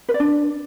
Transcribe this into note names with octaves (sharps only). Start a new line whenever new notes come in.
B4
D5
D4